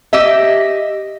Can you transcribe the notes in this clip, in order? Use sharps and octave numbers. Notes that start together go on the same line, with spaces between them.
G4 D#5 E5